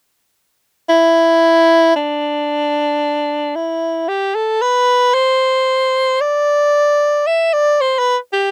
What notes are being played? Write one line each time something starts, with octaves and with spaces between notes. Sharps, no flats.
E4
D4
E4
G4
A4
B4
C5
D5
E5
D5
C5
B4
G4